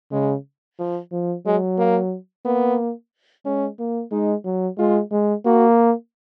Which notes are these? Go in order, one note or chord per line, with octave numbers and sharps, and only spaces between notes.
C#3 G#3
F3
F3
F#3 G#3
A#3
A#3 B3
G#3 C#4
A#3
G#3 D#4
F#3
G#3 F4
G#3
A#3 F#4